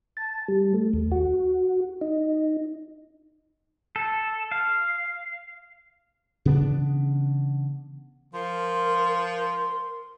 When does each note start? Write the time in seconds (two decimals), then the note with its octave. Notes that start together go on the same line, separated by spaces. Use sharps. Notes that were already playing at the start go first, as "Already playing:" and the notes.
0.17 A5
0.48 G3
0.74 A3
0.93 D#2
1.12 F#4
2.01 D#4
3.96 A4
4.52 F5
6.45 C#3 E3 B3 D4
8.34 F3 A#4 C6